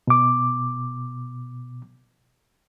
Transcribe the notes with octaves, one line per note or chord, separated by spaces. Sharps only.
B2 D6